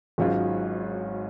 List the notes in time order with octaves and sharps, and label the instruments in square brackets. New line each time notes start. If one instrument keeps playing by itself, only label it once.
[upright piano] G#1 G#2 F#3 C#4 F4